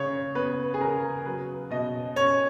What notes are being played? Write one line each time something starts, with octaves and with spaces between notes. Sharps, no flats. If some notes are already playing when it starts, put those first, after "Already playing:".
Already playing: C#3 C#5
B3 B4
G#4
C#3 A#4
F#3 B4
B2 D#5
C#4 C#5